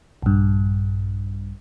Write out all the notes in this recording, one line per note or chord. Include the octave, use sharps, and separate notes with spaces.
A#1 G2